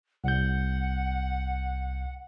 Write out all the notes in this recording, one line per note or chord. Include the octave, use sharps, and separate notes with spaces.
C2 F#5 G6